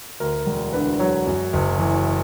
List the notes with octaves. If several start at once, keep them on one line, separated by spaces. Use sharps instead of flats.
D2 A#4
E1
D3 B4
F#3 C#5
F#2
F#1
E3